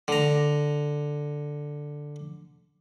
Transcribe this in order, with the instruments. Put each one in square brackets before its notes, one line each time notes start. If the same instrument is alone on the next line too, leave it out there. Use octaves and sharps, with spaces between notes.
[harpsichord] D3 A#5